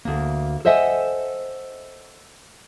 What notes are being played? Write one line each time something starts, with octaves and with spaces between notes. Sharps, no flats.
D2 A#3
A4 C5 D#5 E5 F#5 G#5